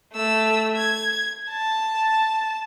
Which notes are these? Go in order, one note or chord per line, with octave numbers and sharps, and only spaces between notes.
A3 E6
G#6
A5